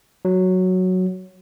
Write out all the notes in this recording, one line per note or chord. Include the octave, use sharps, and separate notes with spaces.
F#3